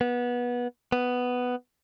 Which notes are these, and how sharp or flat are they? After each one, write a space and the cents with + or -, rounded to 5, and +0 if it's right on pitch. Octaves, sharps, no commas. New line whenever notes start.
B3 -20
B3 +5